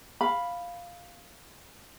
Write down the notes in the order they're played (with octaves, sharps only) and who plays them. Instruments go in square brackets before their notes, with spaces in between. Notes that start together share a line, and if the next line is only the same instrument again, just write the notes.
[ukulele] F5 B5